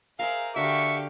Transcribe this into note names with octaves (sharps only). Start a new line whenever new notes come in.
G#4 A#4 C5 E5 F5
D3 F#4 G4 E5 F5 C#6